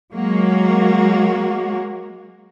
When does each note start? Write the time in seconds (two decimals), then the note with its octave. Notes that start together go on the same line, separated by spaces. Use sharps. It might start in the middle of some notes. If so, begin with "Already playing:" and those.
0.15 F#3 G#3 A#3 F#4